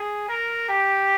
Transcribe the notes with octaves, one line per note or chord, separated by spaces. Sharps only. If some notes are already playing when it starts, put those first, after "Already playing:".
Already playing: G#4
A#4
G4